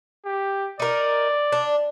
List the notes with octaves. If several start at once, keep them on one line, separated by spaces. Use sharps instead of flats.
G4
D#4 A#4 D5
D4